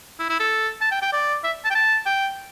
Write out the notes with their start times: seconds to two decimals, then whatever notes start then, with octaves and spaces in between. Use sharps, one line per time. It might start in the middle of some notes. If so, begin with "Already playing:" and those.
0.19 E4
0.29 E4
0.40 A4
0.81 A5
0.91 G5
1.02 G5
1.13 D5
1.44 E5
1.65 A5
1.71 G5
1.75 A5
2.06 G5